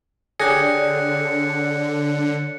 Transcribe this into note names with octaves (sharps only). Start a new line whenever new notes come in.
D3 G4 G#4 C#5 D5 F#6 A#6 C#7